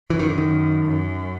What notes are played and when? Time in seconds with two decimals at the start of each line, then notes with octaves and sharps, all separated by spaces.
0.10 F#2 E3
0.19 D#3
0.29 D3
0.38 D#3
0.84 F#2